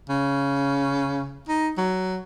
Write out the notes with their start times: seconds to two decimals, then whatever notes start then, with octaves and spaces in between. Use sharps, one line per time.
0.09 C#3
1.49 D#4
1.77 F#3